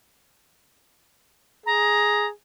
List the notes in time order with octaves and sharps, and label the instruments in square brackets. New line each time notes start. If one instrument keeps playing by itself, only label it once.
[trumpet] G#4 [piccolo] A#5